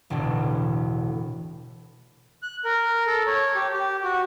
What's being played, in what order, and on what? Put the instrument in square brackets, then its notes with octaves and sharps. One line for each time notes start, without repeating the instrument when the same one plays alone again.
[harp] E1 A1 B2 D3
[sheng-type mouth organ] F#6
A#4
A4
C#5
G4
G4
F#4